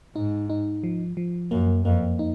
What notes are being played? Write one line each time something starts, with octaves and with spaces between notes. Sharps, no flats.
G#2 D#4
D#4
F3
F3
F#2 A#3
F2 A#3
D#4